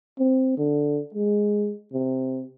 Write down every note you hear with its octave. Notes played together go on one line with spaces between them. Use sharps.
C4
D3
G#3
C3